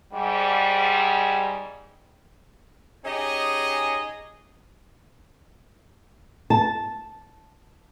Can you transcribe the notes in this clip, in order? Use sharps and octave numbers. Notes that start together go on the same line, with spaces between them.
G#2 G3
C#4 D#4 G4 G#4 D#5
A5